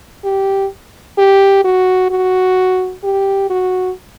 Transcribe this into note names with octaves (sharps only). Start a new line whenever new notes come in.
G4
G4
F#4
F#4
G4
F#4